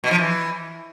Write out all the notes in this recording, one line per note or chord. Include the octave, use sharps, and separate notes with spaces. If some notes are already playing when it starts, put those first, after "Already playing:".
B2
F3
E3